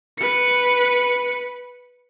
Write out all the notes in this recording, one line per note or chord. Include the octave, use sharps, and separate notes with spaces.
B4 C#7